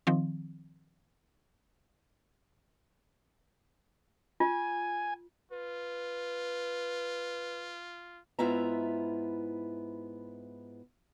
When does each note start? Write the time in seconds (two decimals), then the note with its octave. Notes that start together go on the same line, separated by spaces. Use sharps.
0.07 D#3 F3 C4
4.40 F4 G#5
5.52 F4 B4
8.39 G#2 B3 E4 F4 E5 A#5